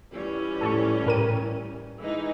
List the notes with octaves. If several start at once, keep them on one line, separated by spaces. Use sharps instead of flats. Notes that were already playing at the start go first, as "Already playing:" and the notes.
E2 E3 G3 C#4 F4
E2 A2 F3 A4 A5 C#6
A2 G4 A#4 D#7
E3 G#3 D#4